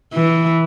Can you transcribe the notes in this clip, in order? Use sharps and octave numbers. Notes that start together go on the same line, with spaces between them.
E3